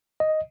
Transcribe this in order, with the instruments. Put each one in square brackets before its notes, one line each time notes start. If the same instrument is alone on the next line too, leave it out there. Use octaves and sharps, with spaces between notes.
[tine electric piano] D#5